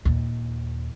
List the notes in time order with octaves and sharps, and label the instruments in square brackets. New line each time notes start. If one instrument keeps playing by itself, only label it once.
[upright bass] D#2 A#2